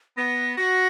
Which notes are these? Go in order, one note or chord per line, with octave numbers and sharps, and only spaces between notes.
B3 A#6
F#4 A#6